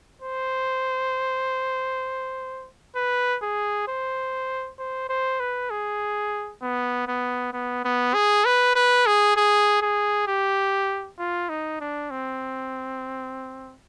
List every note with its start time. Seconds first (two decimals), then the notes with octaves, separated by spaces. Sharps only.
0.22 C5
2.96 B4
3.42 G#4
3.88 C5
4.79 C5
5.09 C5
5.40 B4
5.71 G#4
6.62 B3
7.08 B3
7.53 B3
7.85 B3
8.14 G#4
8.45 B4
8.76 B4
9.07 G#4
9.37 G#4
9.82 G#4
10.28 G4
11.19 F4
11.49 D#4
11.81 D4
12.10 C4